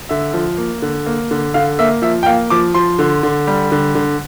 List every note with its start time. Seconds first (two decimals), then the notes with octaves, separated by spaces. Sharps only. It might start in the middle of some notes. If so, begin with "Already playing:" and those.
0.09 D3 E5
0.34 F3
0.58 A#3
0.82 D3
1.06 A#3
1.31 D3
1.54 D3 F5
1.79 A#3 E5
2.02 F3 E5
2.23 G5
2.26 A#3 F5
2.50 F3 D6
2.75 F3 C6
2.99 D3
3.23 D3
3.47 G3
3.72 D3
3.95 D3